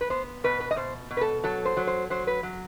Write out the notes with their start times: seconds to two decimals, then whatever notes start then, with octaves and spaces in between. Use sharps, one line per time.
0.01 B4
0.10 B3 C5
0.44 B2 B4
0.60 B4
0.71 D#5
0.76 B2 C5
1.11 B2
1.17 B4
1.21 A4
1.44 F#3 A4
1.65 C5
1.77 F#3
1.87 C5
2.10 F#3 C5
2.27 B4
2.43 F#3